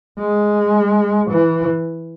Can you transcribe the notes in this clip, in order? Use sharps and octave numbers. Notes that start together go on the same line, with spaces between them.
G#3
E3